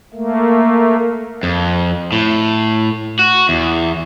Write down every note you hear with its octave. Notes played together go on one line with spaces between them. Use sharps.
A3 A#3
F2
A2
F#4
E2